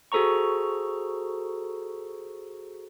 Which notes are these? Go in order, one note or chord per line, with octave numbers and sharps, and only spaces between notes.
F#4 G#4 A4 C5 A#5 C#6